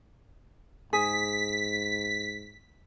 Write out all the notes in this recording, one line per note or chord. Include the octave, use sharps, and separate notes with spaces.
G#2 G#4 B6